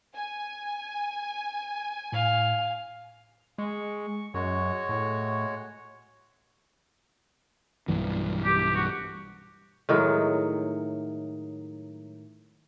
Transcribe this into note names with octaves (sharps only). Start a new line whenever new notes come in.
G#5
A2 F5
G#3 C#6
F#2 G#3 F#4 C#5
A2
B1 G2 E3
G4
F#4
A2 D#3 F#3 G#3